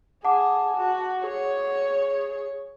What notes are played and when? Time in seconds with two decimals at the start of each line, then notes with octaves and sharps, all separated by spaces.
0.25 G#4 F#5 A5 D6
0.77 F#4
1.24 G#4 C#5